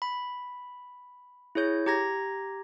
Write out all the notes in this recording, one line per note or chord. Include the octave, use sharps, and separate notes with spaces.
B5
E4 G#4 C#5 G6
G4 A#5 G#6 A#6